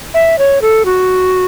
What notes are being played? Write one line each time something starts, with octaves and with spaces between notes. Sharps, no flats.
E5
C#5
A4
F#4